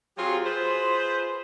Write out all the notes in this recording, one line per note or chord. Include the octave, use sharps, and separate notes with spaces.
F#3 C4 F4 G4 G#4
F4 G#4 B4 C5